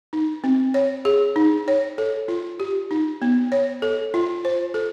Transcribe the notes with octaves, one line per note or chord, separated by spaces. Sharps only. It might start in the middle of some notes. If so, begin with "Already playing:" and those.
D#4
C4
C#5
G#4
D#4
C#5
A4
F4
G4
D#4
B3
C#5
A4
F4
C5
A4